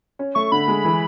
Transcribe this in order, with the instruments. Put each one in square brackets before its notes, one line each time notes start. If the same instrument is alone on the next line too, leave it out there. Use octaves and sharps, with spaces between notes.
[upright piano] C#4
[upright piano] A3 [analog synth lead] C#6
[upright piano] D3 [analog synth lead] B5
[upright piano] G#3
E3